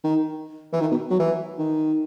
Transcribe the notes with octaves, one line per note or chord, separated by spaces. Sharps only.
D#3
E3
D#3
B2
F#3
E3
D#3